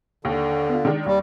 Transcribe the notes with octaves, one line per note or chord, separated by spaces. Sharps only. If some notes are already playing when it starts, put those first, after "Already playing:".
D#2 D3
B3 F4
D#3 G#3 D4
D#2 G3